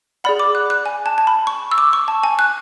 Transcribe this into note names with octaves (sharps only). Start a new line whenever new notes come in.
G#4 D5 F#5 B5
D6
F#6
F#6
G#5
A5
A5
B5
C#6
E6
D6
C#6
A5
G#5
F#6